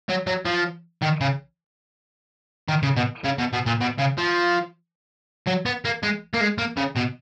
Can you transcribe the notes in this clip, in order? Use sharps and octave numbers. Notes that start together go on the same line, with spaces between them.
F#3
F#3
F3
D#3
C#3
D#3
C#3
B2
C#3
B2
B2
A#2
B2
C#3
F3
F#3
B3
A#3
G#3
A#3
G#3
A#3
C#3
B2